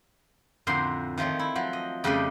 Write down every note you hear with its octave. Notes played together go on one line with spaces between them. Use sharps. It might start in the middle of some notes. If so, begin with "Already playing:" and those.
F2 A2 D3 A#4 C5 C6
D#3 F3 A3 C4 C#5
E4
F3 F#3
D#5
F2 C#3 G3 A3 G4 D#5